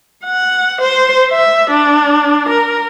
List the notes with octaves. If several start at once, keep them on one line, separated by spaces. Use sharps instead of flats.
F#5
C5
E5
D4
A#4